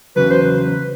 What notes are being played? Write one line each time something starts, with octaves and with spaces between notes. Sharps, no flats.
E2 C#3 F#3 B4
C5
B4